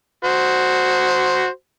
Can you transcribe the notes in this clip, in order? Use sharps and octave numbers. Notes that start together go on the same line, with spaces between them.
F#4 C5